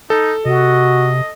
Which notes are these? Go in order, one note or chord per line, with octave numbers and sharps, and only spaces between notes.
D#4 A4
C3 F#4 D#5